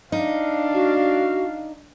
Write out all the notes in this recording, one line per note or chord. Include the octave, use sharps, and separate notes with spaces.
D4 D#4 F5
F#4